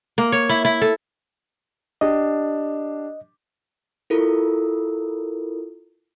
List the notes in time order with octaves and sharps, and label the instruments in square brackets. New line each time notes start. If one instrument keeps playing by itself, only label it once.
[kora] A#3
C#5
E4
E4
A4
[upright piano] D4 G4 [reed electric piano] D#5
[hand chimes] E4 F4 A4 A#4